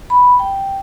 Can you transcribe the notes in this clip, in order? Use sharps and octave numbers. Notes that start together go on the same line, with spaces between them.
B5
G5